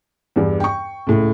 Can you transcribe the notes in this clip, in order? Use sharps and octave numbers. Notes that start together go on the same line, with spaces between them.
E2 G2
G5 C#6
C#2 A2